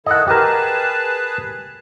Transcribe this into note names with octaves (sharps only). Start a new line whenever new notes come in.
D#3 E4 A4 D#5 F#5
G4 G#4 A#4 B4 A5